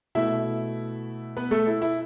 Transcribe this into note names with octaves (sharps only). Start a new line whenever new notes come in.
B2 A3 E4 E5
B3 B4
A3 A4
E4
E4